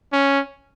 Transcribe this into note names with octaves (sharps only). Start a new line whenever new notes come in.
C#4